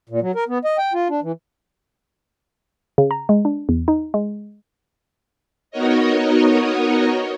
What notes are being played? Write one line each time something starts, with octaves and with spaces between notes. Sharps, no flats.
A#2
F#3
A#4
B3
D#5
G5
F4
D4
E3
C#3
A#5
G#3
D4
E2
D#4
G#3
B3 D#4 F#4 A#4 C#5 D#5